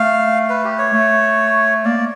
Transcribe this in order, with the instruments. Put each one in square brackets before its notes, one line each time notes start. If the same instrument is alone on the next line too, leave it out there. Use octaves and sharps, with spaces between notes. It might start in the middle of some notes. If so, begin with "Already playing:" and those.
Already playing: [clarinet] A3 [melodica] F5
[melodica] B4
G4
C#5
[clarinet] A3
[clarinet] A#3 [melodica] D5
[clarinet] A#3